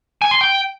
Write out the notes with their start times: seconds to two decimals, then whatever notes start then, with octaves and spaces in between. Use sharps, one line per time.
0.22 G#5
0.31 C6
0.41 G5